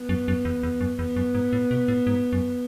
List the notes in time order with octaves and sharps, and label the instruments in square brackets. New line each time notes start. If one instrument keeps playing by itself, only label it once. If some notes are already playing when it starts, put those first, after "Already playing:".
Already playing: [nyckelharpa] B3
[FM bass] F#2
F#2
E2
E2
F#2
[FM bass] E2 [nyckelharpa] B3
[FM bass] F#2
G#2
A2
B2
A2
G#2
F#2